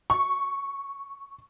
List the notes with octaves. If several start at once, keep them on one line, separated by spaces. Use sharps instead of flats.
C#6